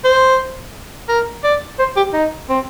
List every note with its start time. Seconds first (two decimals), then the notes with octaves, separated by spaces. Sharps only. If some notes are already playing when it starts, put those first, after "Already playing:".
0.04 C5
1.09 A#4
1.44 D5
1.79 C5
1.97 G4
2.13 D#4
2.49 C4